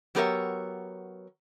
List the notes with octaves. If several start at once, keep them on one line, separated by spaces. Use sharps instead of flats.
F#3 B3 G4 A#4 C#5 E5